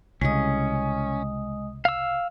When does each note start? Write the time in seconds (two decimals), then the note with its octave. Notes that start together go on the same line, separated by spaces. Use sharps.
0.21 C2 C#3 G#3 C#4 D#5 D#6
1.85 F5 E6